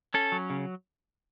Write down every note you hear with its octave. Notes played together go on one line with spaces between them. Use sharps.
C#4 A4
F#3
C#3